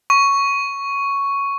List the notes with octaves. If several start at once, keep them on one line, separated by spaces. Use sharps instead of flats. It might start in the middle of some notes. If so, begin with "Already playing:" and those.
C#6